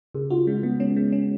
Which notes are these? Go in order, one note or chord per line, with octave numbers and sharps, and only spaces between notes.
C#3 G#4
F4 F#4
G#3 C#4
G#3 B3
C#4
G#3
C#4